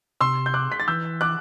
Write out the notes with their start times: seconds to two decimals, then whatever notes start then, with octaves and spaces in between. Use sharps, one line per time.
0.21 C3 C6 E6
0.46 G6
0.54 D6 F#6
0.72 B6
0.80 A6
0.88 E3 E6 G6
1.21 D6 F#6